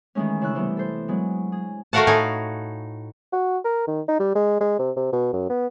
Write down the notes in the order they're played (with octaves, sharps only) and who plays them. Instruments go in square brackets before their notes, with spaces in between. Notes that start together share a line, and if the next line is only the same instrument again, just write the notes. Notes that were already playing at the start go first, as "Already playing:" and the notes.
[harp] D#3 E3 G#3 A3 C#4
C#3 D4 E4 C#6 E6 F#6
C3 E3 G3 B3
A4 C5
F#3 G#3 B3
G#4
[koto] A3 F#4 A#4 F5 F#5 A5
A2 D#4 G#5
[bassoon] F#4
A#4
D#3
D#4
G3
G#3
G#3
C3
C3
B2
F#2
B3